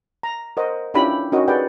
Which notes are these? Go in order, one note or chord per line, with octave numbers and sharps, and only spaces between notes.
A#5
A#4 C5 D#5 F#5
C#4 D4 E4 F4 G4 B5
C#4 D#4 F#4 A#4 D#5
G4 G#4 B4 D5 F#5 G5